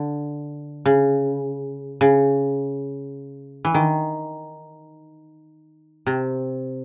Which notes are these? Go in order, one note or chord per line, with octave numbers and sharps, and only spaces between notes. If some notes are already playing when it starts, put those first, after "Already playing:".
Already playing: D3
C#3
C#3
E3
D#3
C3